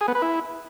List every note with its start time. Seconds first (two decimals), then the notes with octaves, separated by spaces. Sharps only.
0.01 G#4
0.08 B3
0.15 B4
0.22 E4